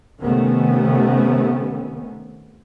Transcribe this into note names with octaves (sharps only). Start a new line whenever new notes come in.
C3 D#3 A3 B3 C#4